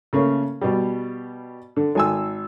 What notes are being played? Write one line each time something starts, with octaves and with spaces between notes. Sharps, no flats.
C#3 A3 A#3 C#4
B2 G3
D3
G#1 G#5 E6